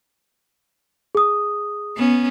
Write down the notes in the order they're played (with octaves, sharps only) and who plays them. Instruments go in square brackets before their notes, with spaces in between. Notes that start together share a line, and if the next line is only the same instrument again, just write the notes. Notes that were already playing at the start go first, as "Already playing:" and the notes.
[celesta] G#4 D#6
[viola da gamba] B3 C#4